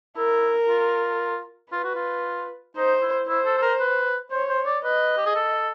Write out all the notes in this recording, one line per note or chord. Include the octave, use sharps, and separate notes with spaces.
E4 A#4
F4
F4 B4
F#4
F4
D#4 C5
E4
E4 C5
A4
A4
A#4
B4
C5 C#5
C5
D5
B4 D#5
G4
G#4
A4